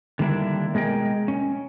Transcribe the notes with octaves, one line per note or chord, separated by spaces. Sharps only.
D3 D#3 G3 A#3 D4 E4
B2 G#3 G#4 A#4 D#5 G5
C#4